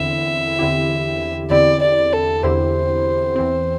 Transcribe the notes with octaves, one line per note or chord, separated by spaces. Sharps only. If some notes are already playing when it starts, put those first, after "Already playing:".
Already playing: E2 D3 C4 E4 E5
E2 D3 C4 E4 G4
E2 D3 C4 E4 G4 D5
D5
A4
E2 D3 C4 E4 G4 C5
E2 E3 C4